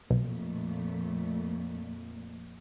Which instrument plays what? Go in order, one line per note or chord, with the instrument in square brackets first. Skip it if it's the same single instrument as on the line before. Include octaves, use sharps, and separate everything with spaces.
[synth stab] B1 [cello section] F2 A#2 A3